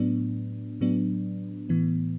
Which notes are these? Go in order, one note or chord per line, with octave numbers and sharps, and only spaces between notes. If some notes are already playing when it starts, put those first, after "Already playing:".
Already playing: A2 F#3 B3 D4
A2 F#3 B3 D4
A2 E3 B3